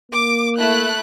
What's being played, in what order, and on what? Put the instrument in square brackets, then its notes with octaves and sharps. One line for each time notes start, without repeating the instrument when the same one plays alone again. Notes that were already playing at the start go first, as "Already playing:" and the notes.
[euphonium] A#3 [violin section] D6
[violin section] A3 E4 F#6